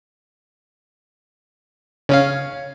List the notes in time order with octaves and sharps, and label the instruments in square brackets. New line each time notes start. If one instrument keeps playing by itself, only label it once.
[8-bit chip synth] C#3 C#4 F5 [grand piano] C#5